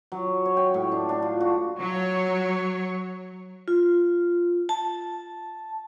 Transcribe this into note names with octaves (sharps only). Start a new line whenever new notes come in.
F#3
C#5
G5
A2
D4
D4
F4
F#4
F#3 C#5
F4
A5